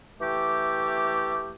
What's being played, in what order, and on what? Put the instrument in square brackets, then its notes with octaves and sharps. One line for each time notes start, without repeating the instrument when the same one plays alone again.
[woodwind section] E3 A3 G4